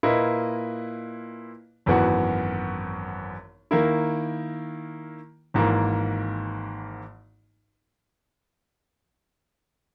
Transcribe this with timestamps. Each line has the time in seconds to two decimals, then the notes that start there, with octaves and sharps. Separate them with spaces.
0.03 A#2 A#3 E4 B4 D#5
1.86 G#1 F#2 E3 B3 F#4
3.71 D#3 A#3 E4
5.54 G#1 G#2 E3 A#3